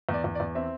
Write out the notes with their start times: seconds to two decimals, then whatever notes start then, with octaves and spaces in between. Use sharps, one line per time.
0.09 E2
0.14 D5
0.24 E2
0.35 D5
0.40 E2
0.55 C4 E5